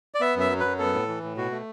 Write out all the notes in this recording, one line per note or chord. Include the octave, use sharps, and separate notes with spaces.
D5
B3 E5
F#2 E5
F#3
F#2 B4
B3 A4
A2
E3
A2
B2 F#4
A3